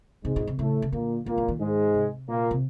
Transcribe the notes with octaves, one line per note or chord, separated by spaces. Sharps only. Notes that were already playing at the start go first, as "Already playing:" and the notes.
G#2 C3 G#3
A#2
C3
A2 C#3 A3
C#3
A#2 D3 A#3
A#2 D#3 A#3
E3
D#3
G#2 G#3
C3
A#2 A#3
C3